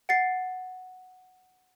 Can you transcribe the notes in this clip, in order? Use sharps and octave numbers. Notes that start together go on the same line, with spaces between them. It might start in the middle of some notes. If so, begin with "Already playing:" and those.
F#5 A6 C7